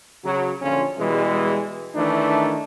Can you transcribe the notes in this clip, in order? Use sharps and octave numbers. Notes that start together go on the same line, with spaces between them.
C#3 F#3
A#1 D3 C#4 F4
B2 E3 G3 G#3
D#3 E3 A3 D4 D#4